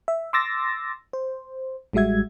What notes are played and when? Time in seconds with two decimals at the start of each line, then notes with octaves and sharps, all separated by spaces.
0.08 E5
0.33 C6 D6 E6 A6 A#6
1.13 C5
1.93 A1 G3 G#3 F#4 E5 G#6